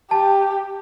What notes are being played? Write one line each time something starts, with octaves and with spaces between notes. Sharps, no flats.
G4 A5